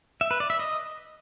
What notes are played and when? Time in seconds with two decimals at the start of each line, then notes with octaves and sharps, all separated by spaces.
0.21 E5
0.31 B4
0.40 D5
0.50 E5
0.59 D#5